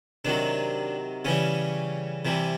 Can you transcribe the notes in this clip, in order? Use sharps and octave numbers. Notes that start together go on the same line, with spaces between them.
C3 D#3 F#3 D4
C#3 E3 G3 C#4
C3 E3 G3